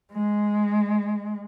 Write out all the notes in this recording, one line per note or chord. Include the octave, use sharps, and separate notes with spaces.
G#3